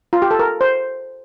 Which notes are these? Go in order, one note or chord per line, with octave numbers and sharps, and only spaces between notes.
F4
G4
A4
A#4
C5